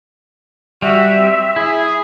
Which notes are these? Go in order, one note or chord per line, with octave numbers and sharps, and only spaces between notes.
G3 F#4 E5
C4
E4 G#4